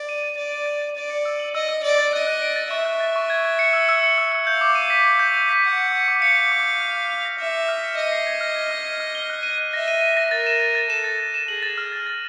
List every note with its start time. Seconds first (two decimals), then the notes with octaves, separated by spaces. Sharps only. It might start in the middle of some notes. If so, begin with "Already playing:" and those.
Already playing: D5
0.09 D#7
0.23 A6
0.37 D5 D#7
0.52 D#7
0.66 A6
0.82 D#7
0.96 D5 A6
1.10 C#7
1.25 E6
1.40 F#7
1.55 D#5 E6
1.69 E6
1.83 D5 F#7
1.99 A6
2.13 D#5 F#6
2.27 F#6
2.42 D7
2.56 A6
2.71 E5 C#6
2.85 F#6
3.00 A6
3.16 C#6
3.30 G#6
3.45 G#6
3.59 C#7
3.73 E6
3.89 E6
4.03 C#7
4.18 E6
4.32 E6
4.47 F5 G6
4.61 D6
4.75 D#7
4.90 B6
5.06 G6
5.19 G6
5.34 G6
5.49 B6
5.64 F#5 C#7
5.78 C#7
5.92 D6
6.08 D6
6.22 F5 C#7
6.37 C#7
6.52 D6
6.66 D6
6.80 F6
6.95 F6
7.09 F7
7.25 A#6
7.39 E5 F6
7.54 C#7
7.68 F6
7.83 C#7
7.97 D#5 F6
8.12 C7
8.26 G#6
8.41 F6
8.56 G#6
8.71 F6
8.85 C7
9.00 F6
9.15 G7
9.30 F#6
9.43 D#7
9.58 F#6
9.73 E5 A#6
9.88 D#7
10.02 D#7
10.17 A#6
10.31 A#4 A6
10.47 E7
10.60 A6
10.75 A6
10.89 A4 E7
11.04 A6
11.20 A6
11.34 E7
11.48 G#4 F#7
11.63 A6
11.78 F6
11.92 A6
12.06 A6